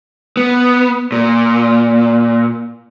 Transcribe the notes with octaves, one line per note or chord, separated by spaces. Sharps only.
B3
A#2